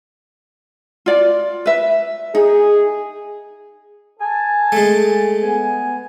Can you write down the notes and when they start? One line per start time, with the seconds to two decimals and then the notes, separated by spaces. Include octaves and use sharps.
1.06 F4 D5
1.66 B4 E5
2.35 D#4 G#4
4.20 A4 G#5 A5
4.72 G#3 A3
5.41 B3 G#5